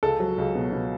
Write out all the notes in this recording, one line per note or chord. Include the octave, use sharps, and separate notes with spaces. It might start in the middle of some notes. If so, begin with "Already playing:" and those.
C#2 A4
F#3
C#2
B2
B2